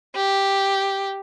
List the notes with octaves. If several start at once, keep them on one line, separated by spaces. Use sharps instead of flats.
G4